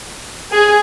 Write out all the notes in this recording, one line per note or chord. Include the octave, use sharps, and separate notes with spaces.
G#4